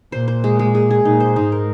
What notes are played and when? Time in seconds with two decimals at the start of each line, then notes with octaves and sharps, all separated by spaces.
0.12 A#2 C5
0.28 C5
0.44 G#3
0.59 G#3
0.75 G#4
0.91 G#4
1.05 A#2 D#4
1.20 C5
1.36 G#2 D#4
1.52 A#4